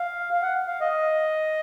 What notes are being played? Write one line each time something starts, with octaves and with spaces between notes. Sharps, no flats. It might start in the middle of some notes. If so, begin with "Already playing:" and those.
Already playing: F5
F5
F#5
F5
D#5